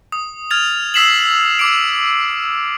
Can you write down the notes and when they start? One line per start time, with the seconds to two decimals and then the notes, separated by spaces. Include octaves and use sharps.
0.12 D#6
0.51 F6 G#6 A6 F7
0.94 D#6 E6 B6 C7 E7 F#7
1.59 D6 D7